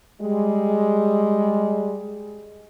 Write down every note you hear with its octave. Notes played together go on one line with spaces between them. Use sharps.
G3 G#3